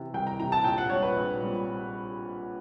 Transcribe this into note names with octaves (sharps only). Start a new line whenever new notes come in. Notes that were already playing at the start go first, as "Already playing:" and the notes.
Already playing: C3 E3
C2 G5
A#5
C3 E3 A#5
A5
A#1 G5
F#5
A#2 G3 C4 C#5
B4
A#1
A#2 G3 C4